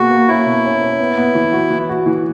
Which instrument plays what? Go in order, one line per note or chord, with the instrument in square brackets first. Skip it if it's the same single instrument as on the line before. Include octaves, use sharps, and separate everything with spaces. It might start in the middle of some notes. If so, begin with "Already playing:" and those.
Already playing: [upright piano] B2 A#3 G#4 [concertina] F#4
[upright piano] A#3
[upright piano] C#4 [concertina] E4
[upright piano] B2
C#4
C#4
B3
B3
E3
F#4
E3
F#4
E3